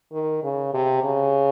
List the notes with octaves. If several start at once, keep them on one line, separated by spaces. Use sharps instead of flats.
D#3
C#3
C3
C#3